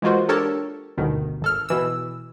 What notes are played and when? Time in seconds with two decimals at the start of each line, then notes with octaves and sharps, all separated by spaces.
0.02 E3 G#3 A#3 F4 F#4 C5
0.29 D4 G4 A4 A#4 C#5 A5
0.98 G1 D2 B2 D#3
1.42 G#1 A4 F6
1.69 B2 E3 E6